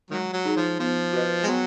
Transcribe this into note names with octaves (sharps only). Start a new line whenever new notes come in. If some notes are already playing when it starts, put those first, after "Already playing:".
D#3 F#3 G#3
F#3
D#4 G#4 C#5
F3
F3 B3
F#4 B4 D#5
G#3
F#3 B3